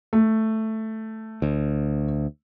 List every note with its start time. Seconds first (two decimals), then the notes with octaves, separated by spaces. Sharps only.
0.13 A3
1.42 D2